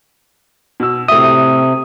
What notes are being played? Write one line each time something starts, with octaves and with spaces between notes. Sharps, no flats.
B2 E6
A2 C3 E5 D#6